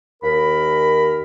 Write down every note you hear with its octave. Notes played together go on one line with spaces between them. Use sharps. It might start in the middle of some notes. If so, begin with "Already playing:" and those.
D#2 A#4 B5